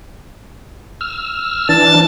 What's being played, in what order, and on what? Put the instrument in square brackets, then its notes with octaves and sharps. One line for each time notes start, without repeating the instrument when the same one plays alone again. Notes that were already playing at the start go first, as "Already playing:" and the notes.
[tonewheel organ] E6 F6
[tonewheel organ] E3 D4 [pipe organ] A5 A6